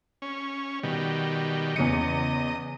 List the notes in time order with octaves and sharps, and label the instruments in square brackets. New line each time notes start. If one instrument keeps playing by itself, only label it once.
[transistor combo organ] C#4
B2 D#3 G3
[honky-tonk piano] E2 C#3 C#7 [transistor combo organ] D#5